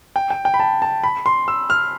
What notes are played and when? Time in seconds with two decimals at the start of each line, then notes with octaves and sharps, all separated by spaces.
0.16 G5
0.30 G5
0.45 G5
0.54 B5
0.60 A5
0.82 A5
1.04 B5
1.26 C6
1.48 E6
1.70 F6